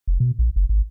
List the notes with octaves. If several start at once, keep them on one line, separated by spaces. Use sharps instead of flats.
F1
B2
A#1
F#1
G#1